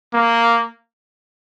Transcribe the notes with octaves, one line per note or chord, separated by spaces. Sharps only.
A#3